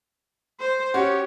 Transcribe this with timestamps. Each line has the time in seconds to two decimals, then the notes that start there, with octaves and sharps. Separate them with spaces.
0.60 C5
0.94 C#4 F#4 G4 C#5